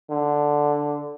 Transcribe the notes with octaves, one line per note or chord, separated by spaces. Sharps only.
D3